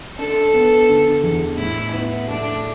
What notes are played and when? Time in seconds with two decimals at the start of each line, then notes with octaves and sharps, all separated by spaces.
0.19 D4 A4
0.54 B3
0.88 D3
1.23 E2
1.58 A2 E4
1.93 B3 E4
2.28 A3 D4